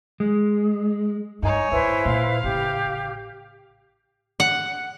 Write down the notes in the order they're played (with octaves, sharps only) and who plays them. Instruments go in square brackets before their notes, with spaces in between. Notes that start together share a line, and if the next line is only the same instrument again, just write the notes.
[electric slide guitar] G#3
[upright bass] G2 [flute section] D#4 [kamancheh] C#5 G#5
[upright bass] D2 A2 [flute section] E4 B4 C5
[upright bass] A#2 [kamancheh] F5
[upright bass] A1 C#3 [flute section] G4
[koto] F#5